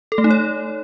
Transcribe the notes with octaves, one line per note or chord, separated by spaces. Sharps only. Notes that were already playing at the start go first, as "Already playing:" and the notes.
A4
A3
D#4
C#5